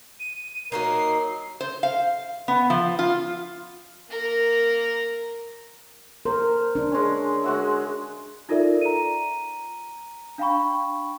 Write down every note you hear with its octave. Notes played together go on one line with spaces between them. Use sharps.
D#7
F#3 A#3 D#4 A#4 C7
C5
F5
B3
F3
F4
A#3 A#4
A#4 C5
D4
G#3 C#4
G#3 F#4 E5
D#4 F4 A4 A#4 D5 E5
A#5 D#7
D4 F5 G5 B5 C#6